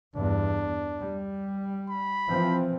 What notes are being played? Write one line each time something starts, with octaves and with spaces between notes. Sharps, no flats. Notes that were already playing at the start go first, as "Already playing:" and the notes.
E2 G2 D4
G3
B5
E3 F3 C4